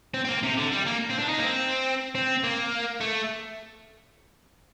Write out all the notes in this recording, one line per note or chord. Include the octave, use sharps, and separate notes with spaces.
C4
C4
A#3
C3
D3
G3
A#3
C4
D4
D#4
A#3
C4
C4
A#3
A3